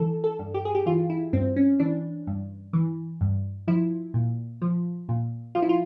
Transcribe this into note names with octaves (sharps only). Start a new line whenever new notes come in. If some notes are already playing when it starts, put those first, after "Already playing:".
Already playing: E3 A4
A4
G2
G4
G#4
G4
E3 F4
E4
G2 C4
C#4
E3 D4
G2
E3
G2
F3 E4
A#2
F3
A#2
F3 F4
E4
F4